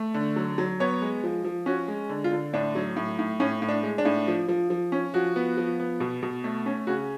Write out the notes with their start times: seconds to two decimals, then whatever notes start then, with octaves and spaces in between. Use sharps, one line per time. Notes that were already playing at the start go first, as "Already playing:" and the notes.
Already playing: A3
0.14 D3
0.36 F#3
0.58 F#3
0.80 B3 C#5
1.02 G#3
1.24 F3
1.44 F3
1.66 C#4 F#4
1.88 G#3
2.09 D3
2.24 F4
2.32 D3
2.53 A2 D4
2.75 F#3
2.96 A2
3.19 A2
3.40 A2 C#4
3.62 A2
3.69 D4
3.83 G#3
3.98 D4
4.05 A2
4.28 F3
4.48 F3
4.70 F3
4.92 C#4
5.14 F3 F#4
5.36 B3
5.57 F3
5.80 B3
6.00 B2
6.23 B2
6.44 A3
6.66 C#4
6.87 C#3 F#4